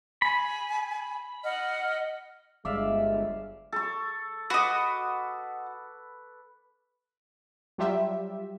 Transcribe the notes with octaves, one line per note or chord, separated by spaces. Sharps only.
G#5 B5
D#5 F#5 F6
G1 G#3 D5 E5 F5
A4 C#6
F#4 B4 D#5 D6
F#3 G3 F4 G4 E5